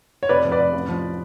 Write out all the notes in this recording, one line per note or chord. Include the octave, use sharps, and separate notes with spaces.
C#5
F1 B4 D5
F2
B4 D5
F1
A1
F3